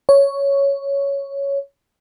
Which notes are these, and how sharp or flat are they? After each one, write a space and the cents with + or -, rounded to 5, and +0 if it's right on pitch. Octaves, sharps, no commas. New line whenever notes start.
C#5 +5